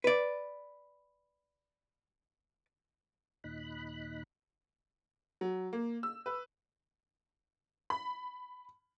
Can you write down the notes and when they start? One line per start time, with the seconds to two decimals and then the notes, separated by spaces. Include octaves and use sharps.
0.04 B4 D5
3.44 D#2 A#2 D#4 B5 F#6
5.41 F#3
5.73 A#3
6.03 E6
6.26 B4
7.90 B5